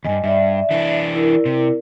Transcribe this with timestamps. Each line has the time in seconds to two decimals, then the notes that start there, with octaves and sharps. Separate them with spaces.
0.04 E2 G2 D#5 G#5
0.24 G2 D5 E5
0.71 E3 D4
1.15 E4 A#4 D5
1.46 C3